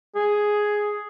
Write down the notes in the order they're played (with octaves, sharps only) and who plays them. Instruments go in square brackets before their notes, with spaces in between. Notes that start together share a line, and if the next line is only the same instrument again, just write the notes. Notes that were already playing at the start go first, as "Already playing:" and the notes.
[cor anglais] G#4